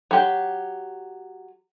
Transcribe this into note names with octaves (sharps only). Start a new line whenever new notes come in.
F#3 G4